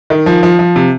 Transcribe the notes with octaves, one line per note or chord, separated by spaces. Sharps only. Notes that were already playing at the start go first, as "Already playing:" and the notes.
D#3
F3
F3
F3
C3